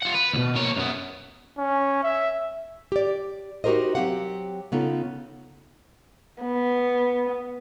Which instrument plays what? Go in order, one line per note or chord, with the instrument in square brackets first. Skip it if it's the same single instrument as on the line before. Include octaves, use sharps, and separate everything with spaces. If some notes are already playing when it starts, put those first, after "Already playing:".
[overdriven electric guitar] F4 F#5
B4
D2 B2
A#3 C#5
F#2 B3
[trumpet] C#4
E5
[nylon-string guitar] G4 D5
D#4 F#4 G4 A#4 C5 D#5
F#3 A#3 C4 G4 F5 F#5
C#3 B3 D#4 F4 A4
[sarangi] B3